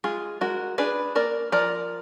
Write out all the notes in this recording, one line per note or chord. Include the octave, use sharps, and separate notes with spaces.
G#3 F4 G#4
G#3 F#4 A#4
D4 G#4 B4
A#3 A#4 D5
F3 A#4 D5